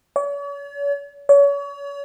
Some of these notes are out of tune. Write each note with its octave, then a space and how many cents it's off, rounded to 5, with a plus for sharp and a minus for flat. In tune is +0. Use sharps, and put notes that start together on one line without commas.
C#5 +45
C#5 +35